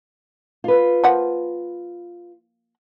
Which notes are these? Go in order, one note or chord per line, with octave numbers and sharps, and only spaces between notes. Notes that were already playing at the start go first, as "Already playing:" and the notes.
F4 B4
F3 A#3 F#5